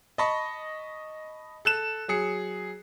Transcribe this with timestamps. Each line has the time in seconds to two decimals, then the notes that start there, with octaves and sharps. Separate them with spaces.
0.18 D#5 A5 B5 C#6
1.65 A4 F#6 E7
2.08 F#3 G#4 C#7